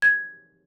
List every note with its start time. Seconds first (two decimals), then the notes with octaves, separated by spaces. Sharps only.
0.02 G#6